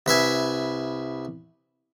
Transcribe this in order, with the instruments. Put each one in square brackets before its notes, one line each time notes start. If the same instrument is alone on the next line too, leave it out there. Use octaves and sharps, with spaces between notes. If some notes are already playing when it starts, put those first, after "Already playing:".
[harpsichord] C2 B4 E5 G#5